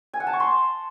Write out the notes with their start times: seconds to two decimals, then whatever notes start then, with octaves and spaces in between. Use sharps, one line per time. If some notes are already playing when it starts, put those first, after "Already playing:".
0.13 G#5
0.20 F#5
0.27 A5
0.33 C#6
0.40 C6